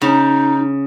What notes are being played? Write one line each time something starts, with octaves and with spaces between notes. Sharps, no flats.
C#3 D#4